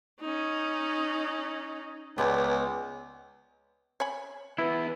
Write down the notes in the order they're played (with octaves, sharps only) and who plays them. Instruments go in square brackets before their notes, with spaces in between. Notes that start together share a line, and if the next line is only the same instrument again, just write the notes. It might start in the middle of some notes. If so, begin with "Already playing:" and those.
[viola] C#4 D#4
[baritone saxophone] C#2 [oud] B3 B4 D5
[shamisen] C#5 G#5 B5
[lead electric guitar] E3 B3 [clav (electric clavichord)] E4